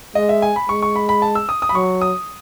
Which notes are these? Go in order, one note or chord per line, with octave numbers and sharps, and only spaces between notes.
G#3 D#5
E5
G#5
B5
G#3 C#6
C#6
B5
B5
A5
E6
D#6
D#6
B5
F#3 C#6
D#6